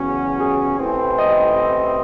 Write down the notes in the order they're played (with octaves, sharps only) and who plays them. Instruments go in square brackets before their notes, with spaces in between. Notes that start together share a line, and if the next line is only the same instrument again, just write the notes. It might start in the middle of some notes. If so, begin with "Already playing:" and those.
Already playing: [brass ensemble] E2 C#3 F#3 C#4 F#4
[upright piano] G#4
[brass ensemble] A1 A2 E3 C4
[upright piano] D#5